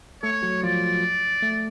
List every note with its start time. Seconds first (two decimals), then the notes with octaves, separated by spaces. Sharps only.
0.23 A3 A4 C#5
0.42 F#3 F#4
0.63 F3 F4 D5
1.43 A3